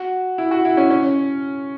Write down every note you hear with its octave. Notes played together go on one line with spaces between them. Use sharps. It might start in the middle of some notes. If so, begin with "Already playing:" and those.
Already playing: F#4
E4
F#4
E4
C#4
C#4